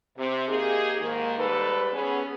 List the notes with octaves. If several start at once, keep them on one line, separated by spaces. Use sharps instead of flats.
C3
A#3 D#4 G4 G#4
G#2 D#3 A#3
G#2 G3 A4 B4
B3 C#4 G#4